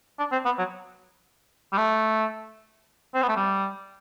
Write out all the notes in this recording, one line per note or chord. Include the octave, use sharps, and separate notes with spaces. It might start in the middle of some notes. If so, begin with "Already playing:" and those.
D4
C4
B3
F#3
G3
A3
C4
B3
A3
G3